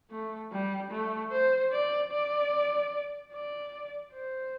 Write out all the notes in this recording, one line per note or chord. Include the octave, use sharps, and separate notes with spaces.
A3
G3
A3
C5
D5
D5
D5
C5